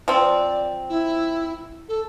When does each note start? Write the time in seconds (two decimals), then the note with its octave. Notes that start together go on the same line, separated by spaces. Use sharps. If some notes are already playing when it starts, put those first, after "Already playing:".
0.08 F3 C4 D5
0.89 E4
1.89 A4